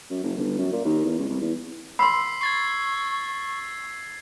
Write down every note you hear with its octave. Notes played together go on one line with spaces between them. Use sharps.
F#2
F#1
G1
F#2
A#2
D#2
E2
C#2
C2
E2
B5 C6 E6 B6 C7
C#6 G#6 A6 C7